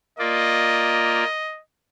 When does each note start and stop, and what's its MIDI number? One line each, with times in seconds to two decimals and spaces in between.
0.19 1.24 58
0.19 1.24 65
0.19 1.24 74
0.19 1.61 75